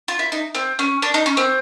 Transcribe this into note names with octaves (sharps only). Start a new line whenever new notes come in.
F4
E4
D#4
C4
C#4
D4
D#4
C#4
C4